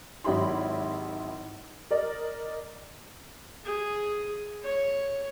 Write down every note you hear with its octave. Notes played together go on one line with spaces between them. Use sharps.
G#1 F#3 E4 G4 B5 C6
A#4 D5 D#5
G#4
C#5